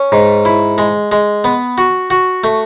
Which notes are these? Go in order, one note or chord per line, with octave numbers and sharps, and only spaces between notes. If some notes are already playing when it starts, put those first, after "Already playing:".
Already playing: C#4
G#2
E4
G#3
G#3
B3
F#4
F#4
A3